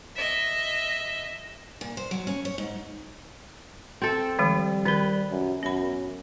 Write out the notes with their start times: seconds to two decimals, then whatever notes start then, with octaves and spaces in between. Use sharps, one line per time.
0.16 D#5 E5
1.81 A#2
1.97 C5
2.11 F#3
2.27 C#4
2.45 C#5
2.58 G#2
4.02 C4 A4
4.39 D#3 F3 G3 G#3
4.86 D#3 A#4 B4
5.31 F#2
5.63 F#2 B3 B5